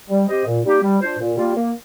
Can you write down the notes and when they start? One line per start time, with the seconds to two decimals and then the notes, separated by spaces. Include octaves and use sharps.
0.09 G3
0.28 C4 G4 C5 D#5
0.45 A#2
0.64 G3 A#3 D#4 G4
0.82 G3
1.01 D4 F4 C5
1.19 A#2
1.37 G3 A#3 F4
1.56 A#3